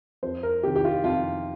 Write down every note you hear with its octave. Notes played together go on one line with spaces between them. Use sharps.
F2 C5
A#4
C3 D#3 G4
G4
F4
F2 F4